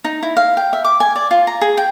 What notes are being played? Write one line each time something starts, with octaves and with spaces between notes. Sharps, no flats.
D#4
E4
F5
G5
E5
D6
G#5
D5
F4
A#5
G#4
G5